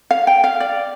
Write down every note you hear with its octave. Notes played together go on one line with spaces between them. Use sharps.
F5
G5
F5
D5